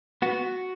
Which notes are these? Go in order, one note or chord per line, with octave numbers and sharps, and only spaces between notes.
B3 F#4